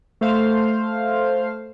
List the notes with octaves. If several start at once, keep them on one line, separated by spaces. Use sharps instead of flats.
A3 C5 F5